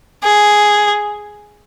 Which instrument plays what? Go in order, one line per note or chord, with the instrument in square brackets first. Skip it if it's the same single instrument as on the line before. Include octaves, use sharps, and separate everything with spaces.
[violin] G#4